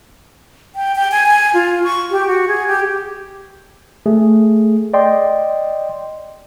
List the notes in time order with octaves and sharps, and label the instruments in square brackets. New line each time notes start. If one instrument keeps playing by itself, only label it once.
[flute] G5
G5
G#5
G#5
F4
C#6
G4
F#4
G#4
G4
[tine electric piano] A3 G#4
D5 D#5 G5 C6